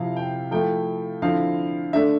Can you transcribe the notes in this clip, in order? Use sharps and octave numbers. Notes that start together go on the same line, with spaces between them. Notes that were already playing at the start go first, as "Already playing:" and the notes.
Already playing: C3 F3 C4 E4 F5
G5
F3 A3 E4 G5
D3 F3 C4 E4 F5
D3 A3 D4 E5